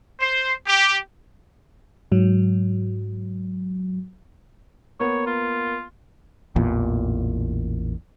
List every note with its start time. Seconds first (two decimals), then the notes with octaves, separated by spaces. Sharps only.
0.20 C5
0.67 G4
2.12 G#2 F#3
5.00 A#3 B3 C#5
5.27 F4
6.56 A1 E2 A#2